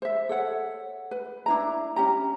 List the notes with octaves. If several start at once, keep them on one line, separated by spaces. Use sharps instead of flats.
C5 E5
A4 C#5 F#5
B4
D4 E4 A#5
C#4 G4 A#5